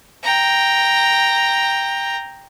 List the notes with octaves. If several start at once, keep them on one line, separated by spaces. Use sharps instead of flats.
G5 A#5